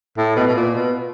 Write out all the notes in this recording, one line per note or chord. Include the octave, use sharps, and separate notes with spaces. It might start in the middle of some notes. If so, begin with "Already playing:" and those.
A2
B2
B2
A#2
B2